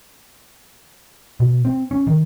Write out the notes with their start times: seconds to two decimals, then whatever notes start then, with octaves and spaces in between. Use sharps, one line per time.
1.40 B2
1.65 C4
1.91 C#4
2.07 D#3